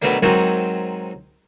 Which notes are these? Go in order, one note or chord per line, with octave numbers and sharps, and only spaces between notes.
B2 D#3 F#3 A3 D4
G#2 D#3 F#3 G#3 C4 F#4